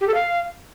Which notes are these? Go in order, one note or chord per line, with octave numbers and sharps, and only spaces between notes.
G4
A4
F5